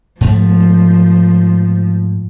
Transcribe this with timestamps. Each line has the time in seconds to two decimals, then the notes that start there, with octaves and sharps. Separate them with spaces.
0.21 G#2 F3 A3